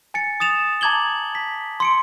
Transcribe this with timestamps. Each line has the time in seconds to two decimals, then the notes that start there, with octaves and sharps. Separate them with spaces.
0.14 G#5 A6 C#7
0.40 D#6 A6 E7 F7
0.81 A5 A#5 D6 G#6 F#7 G7
1.35 B6
1.80 C6 C#7 D7